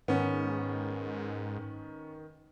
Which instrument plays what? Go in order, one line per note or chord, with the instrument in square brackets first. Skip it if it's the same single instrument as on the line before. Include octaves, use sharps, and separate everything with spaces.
[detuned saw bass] G#2 [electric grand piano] D#3 [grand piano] B3 C#4